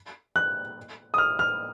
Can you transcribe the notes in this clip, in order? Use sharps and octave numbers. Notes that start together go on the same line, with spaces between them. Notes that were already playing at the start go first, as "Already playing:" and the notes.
F#6
D#6
F6
F6